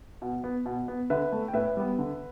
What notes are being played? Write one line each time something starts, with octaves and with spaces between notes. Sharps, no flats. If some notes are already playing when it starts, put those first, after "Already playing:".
B2
B3
B2
B3
D3 B4 E5
A3
G5
A2 B4 E5
G3 B3
D3